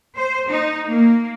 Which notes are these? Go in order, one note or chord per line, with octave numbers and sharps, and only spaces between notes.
C5
D#4
A#3